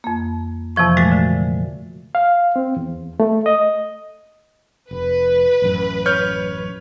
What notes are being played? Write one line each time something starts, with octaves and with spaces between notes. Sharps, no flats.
F2 A#3
F2 C3 E3 F3 C#6
A#2 G#3 A3 F#4 A6
D3
F5
C4
E2
A3
D#5
F1 B4
A1 F#2
C#5 F6 G6